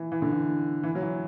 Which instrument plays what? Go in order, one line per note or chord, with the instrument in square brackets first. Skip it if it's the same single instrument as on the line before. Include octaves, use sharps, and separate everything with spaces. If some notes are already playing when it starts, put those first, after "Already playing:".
Already playing: [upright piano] E3
E3
D3
E3
E3
F#3
E3